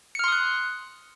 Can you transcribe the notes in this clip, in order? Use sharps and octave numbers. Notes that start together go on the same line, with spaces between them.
C6 D#6 F6 F#6 C#7